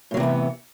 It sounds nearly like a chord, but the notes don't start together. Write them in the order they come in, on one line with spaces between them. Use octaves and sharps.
A2 F#3 C3 E3 B3